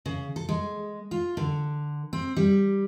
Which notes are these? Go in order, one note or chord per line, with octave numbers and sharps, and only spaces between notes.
C#3
A4
G#3
F4
D3
C4
G3